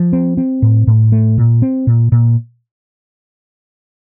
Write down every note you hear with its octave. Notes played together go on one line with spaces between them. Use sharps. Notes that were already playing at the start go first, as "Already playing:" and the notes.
Already playing: F3
C4
C4
A2
A2
A3
A#2
C4
A#2
A#2